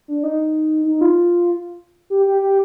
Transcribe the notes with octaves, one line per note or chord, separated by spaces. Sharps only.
D4
D#4
D#4
F4
G4
G4
G4